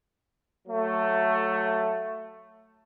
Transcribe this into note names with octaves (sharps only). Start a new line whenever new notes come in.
F#3 A3